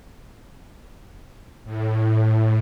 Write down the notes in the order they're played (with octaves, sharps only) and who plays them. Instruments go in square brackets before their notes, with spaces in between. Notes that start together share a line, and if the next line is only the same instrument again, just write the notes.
[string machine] A2